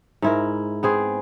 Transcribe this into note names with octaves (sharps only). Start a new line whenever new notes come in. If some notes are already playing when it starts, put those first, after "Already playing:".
G#2 E4 A#4
B3 C4 G#4